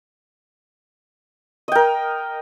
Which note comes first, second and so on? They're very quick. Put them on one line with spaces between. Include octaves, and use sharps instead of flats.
D#5 G5 A#4